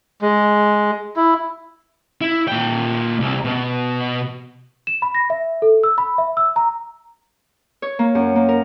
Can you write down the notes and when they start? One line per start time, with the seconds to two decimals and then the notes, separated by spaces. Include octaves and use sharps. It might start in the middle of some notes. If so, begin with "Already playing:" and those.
0.22 G#3
1.16 E4
2.21 E4
2.48 A#2 G5
3.20 C2
3.44 B2
4.87 E7
5.02 B5
5.15 A#6
5.30 E5
5.62 A4
5.84 E6
5.98 B5
6.18 E5
6.37 E6
6.56 A#5
7.82 C#5
7.99 A#3
8.15 F#2
8.36 A#3
8.49 A#4